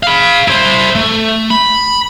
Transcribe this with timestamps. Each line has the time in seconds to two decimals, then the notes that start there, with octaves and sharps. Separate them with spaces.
0.03 F5 B5
0.48 E4 C5
0.95 A3
1.50 B5